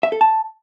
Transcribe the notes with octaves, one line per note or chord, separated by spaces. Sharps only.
E5
A4
A5